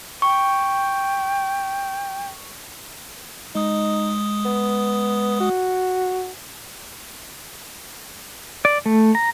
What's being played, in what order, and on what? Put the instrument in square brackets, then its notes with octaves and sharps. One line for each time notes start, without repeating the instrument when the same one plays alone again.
[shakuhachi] G5 [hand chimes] C#6
[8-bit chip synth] G#3 D#6 [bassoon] D#4
[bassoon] B3
F#4
[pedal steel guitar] D5
A3
A#5